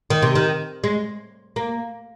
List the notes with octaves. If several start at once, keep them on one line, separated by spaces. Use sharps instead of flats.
D#3
C3
D#3
G#3
A#3